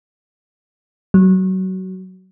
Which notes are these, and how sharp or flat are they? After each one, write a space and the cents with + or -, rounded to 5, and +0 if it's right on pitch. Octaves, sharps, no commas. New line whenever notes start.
F#3 +25